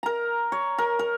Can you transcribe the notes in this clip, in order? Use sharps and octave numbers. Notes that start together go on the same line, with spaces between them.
A#4 A#5
C#5
A#4
A#4